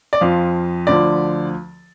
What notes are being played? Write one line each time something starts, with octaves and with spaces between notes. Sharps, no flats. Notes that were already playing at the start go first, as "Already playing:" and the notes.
D5
F2 F3 F5
D2 D3 F3 D5